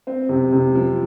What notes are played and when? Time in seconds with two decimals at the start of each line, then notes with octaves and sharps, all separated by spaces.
0.07 C4
0.29 C3
0.52 C3
0.75 F3